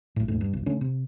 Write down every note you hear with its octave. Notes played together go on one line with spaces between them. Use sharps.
B1 A2
D#1 G#2 A3
G2
G1 C2
D3 A3 C#4
C3